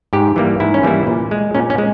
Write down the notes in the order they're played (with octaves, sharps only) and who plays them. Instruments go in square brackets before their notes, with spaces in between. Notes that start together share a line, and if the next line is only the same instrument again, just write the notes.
[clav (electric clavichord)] G#2 G4
E3 G3 A#3
G#2 E4
C#4
E3 G3 A#3 E4
A#2
G#3
A#2 C#4
C#4
G#3